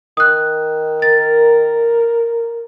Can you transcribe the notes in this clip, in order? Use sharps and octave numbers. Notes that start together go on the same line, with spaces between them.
D#3 D#6 F#6
A#4 A6